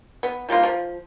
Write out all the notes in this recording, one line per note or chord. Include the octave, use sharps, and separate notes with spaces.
B3
F3 G3 A#3 F4
F3